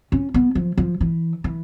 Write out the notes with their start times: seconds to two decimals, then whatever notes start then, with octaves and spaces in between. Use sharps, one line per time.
0.12 C#4
0.34 B3
0.55 F3
0.78 F3
1.01 E3
1.44 E3